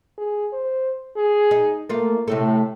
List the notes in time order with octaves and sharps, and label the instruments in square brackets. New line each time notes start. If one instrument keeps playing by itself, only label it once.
[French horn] G#4
C5
G#4
[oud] D#4
[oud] A3 F4 [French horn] A#3
[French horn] A2 [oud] C3 A3 A4